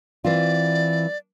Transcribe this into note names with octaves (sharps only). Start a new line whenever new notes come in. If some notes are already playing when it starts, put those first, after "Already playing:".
E3 C4 F4 D5